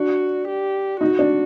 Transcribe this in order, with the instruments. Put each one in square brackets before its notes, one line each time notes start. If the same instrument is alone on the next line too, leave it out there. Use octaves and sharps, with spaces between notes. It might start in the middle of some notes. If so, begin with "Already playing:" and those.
Already playing: [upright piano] D4 [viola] F#4
[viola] G4
[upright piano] D#4 [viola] F#4
[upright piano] D4